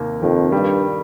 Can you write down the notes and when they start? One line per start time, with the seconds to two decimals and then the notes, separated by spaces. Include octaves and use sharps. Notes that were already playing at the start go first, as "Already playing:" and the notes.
Already playing: D#2 C3 A#3
0.22 F2 D#3
0.52 G2 G3